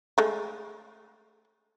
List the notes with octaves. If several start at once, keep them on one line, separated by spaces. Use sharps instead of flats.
G#3 A3